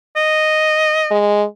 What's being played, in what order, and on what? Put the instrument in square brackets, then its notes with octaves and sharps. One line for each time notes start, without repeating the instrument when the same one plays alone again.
[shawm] D#5
[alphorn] G#3